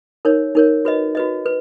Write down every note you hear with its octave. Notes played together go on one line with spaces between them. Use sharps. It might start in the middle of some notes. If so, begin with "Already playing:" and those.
D#4 A#4 C#5
D#4 A#4 C#5
F#4 B4 D#5
F#4 B4 D#5
B4